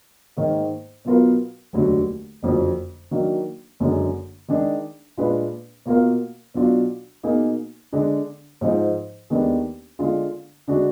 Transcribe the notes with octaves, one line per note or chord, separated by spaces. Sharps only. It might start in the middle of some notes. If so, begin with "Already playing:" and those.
G#2 D#3 A#3
B2 F#3 B3 F4 A#4
F1 D#2 D3 F#3
F#1 F2 D3 F#3
D#3 F#3 A#3 D4
F#1 F#2 D3 G#3
D#3 G#3 D4 G#4
A#2 G#3 D4 F4 B4
B2 A#3 F4 A#4 F5
B2 F#3 D4 F4
B2 A#3 D#4 G#4
D3 G#3 D4
G#2 F3 G#3 D#4
D#2 D#3 G#3 B3 D4
D3 G#3 D4 F4
D3 G#3 D4 F#4